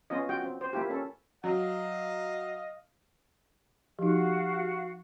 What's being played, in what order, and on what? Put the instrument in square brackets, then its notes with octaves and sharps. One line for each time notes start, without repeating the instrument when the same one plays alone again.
[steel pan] B3 C#4 F4 D#5
F4 F#4 G5
C4
C5
A#3 E4 F4 G4
C#4 A4
[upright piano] F#3 [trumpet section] D#5 F5
[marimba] F3 D#4 [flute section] F#4 F5 [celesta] G4